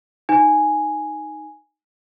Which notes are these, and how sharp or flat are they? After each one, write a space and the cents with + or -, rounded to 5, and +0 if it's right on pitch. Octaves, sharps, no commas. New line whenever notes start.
D#4 +0 G#5 +0